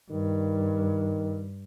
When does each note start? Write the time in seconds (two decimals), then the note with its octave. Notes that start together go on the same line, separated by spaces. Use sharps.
0.11 G2 D#3